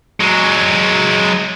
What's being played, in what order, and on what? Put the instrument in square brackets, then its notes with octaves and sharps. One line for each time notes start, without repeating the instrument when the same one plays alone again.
[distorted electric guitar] F#3 G#3